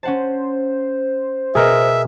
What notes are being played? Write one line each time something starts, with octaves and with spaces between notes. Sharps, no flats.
C#4 C5 F#5 A5
B2 G#4 A#4 D#5 E5